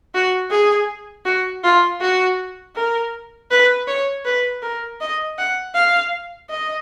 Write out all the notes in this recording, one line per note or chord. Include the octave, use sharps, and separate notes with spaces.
F#4
G#4
F#4
F4
F#4
A#4
B4
C#5
B4
A#4
D#5
F#5
F5
D#5